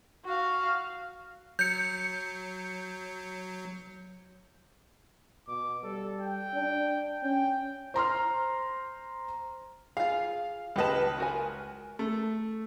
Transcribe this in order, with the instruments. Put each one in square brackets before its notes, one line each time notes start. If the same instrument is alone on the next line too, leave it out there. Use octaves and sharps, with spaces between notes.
[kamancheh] F#4 F5
[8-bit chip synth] F#3 [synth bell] G6 C#7
[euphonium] B2 [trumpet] D6
[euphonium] G3 [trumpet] A4
[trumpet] G5
[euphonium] D4
[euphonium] C#4 [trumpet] G5
[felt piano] C5 A#5 C6 F6
[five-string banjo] F4 G#4 [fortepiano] F5
[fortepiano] C#2 B4 [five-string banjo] G4 D#5 A5
[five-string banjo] F#4 A#4 G#5
[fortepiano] A3